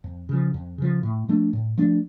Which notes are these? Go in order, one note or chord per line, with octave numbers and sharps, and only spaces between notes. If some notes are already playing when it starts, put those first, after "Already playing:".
F2
C#3 F3
F2
C#3 F3
A2
F3 A3 D4
A2
F3 A3 D4